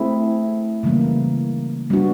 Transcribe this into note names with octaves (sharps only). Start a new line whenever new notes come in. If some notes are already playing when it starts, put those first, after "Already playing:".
Already playing: A3 C4 E4 G#4
C#3 E3 G3 A#3
G3 B3 D4 F#4